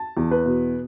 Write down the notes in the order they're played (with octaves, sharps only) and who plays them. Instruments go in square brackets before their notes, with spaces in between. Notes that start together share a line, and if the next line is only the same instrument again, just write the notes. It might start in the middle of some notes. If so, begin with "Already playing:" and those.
Already playing: [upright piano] A5
E2
B4
B2